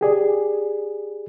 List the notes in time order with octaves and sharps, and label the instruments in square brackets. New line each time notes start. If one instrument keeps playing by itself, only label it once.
[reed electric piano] G4 G#4 D5